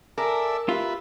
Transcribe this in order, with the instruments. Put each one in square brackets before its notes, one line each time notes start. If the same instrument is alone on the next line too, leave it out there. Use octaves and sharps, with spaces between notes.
[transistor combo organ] A4 D5 E5 [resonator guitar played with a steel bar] A#4 [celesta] G#5
[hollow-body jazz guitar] F4 [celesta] G4 [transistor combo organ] B4 E5